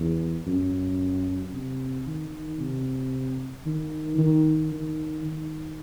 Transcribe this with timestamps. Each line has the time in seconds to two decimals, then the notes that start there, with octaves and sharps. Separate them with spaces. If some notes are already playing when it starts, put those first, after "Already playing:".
Already playing: E2
0.47 F#2
1.53 C3
2.07 D#3
2.60 C3
3.66 D#3
4.18 D#3
4.72 D#3
5.25 D#3